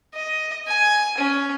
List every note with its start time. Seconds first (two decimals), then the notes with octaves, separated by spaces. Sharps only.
0.14 D#5
0.67 G#5
1.18 C#4